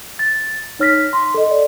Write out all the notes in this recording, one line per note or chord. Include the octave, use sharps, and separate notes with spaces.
A6
D#4 C#5 F6 A#6 B6
C6
A4 D#5
D5